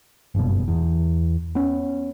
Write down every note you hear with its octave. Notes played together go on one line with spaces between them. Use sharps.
F#1 G2 B2
E2
B3 C#4